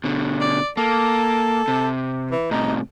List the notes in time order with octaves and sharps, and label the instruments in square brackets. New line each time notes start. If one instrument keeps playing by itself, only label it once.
[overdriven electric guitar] B2 D3
[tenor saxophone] D5
[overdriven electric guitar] A#3 [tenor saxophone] A4
[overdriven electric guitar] C3
[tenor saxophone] E3
[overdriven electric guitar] A2 C3 [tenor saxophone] D#4